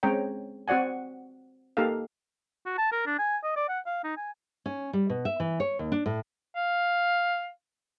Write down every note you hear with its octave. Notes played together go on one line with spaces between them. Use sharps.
G#3 C4 C#4 C#5 G5 A#5
C4 F#4 D5 F#5 G#5
A#3 D#4 G4 A4 F5
F#4
A5
A#4
D4
G#5
D#5
D5
F#5
F5
D#4
G#5
C#4
G3
B2
E5
E3
C#5
D#2
D4
A2
F5